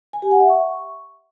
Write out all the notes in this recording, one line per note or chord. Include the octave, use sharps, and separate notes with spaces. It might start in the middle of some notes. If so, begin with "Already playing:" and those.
G#5
G4
F#5
E5
C#6